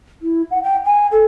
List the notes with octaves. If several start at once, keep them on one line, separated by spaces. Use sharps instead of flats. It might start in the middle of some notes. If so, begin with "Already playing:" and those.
E4
F#5
G5
G#5
A4